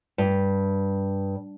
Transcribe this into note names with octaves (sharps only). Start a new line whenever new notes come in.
G2